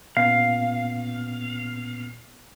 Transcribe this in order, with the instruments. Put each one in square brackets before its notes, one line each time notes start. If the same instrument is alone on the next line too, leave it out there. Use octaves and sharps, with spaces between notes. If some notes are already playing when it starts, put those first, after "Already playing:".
[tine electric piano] A#2 B3 C#4 [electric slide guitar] F5